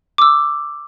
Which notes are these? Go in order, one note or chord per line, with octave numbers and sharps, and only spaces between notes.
D6 E6